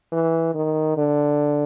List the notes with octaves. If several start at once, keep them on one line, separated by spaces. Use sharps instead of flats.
E3
D#3
D3